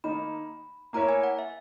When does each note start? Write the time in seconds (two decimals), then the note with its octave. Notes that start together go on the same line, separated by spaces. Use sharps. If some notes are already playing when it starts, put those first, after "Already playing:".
0.04 D#3 A#3 D#4 B5
0.93 A#3 E4 A#4 C#5 E5 A#5
1.09 G#5
1.23 F#5
1.39 E5